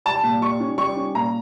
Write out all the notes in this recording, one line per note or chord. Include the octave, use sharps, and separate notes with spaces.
G3 A5
A#2
G3 C#6
C#4
G3 C#6
C#4
A#2 A#5